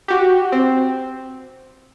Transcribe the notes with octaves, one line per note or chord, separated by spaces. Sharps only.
F#4 G4
C4